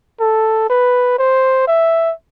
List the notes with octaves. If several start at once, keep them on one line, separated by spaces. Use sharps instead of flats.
A4
B4
C5
E5